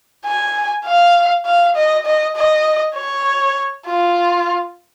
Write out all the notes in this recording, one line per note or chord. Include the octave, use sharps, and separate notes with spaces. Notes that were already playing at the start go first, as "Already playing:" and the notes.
G#5
F5
F5
D#5
D#5
D#5
C#5
F4